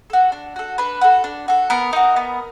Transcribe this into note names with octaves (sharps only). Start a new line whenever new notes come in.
F#4 A4
D4
F#4 A4
D4 B4
F#4 A4
D4
F#4 A4
B3 A#4
D#4 F#4
B3